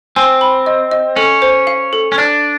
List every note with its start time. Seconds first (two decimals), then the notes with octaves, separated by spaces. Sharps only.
0.16 C4 G#5
0.41 B5
0.66 D#5
0.91 D#5
1.16 C#4 A4
1.42 C5
1.67 F5
1.93 A4
2.12 C#4
2.18 D4 D5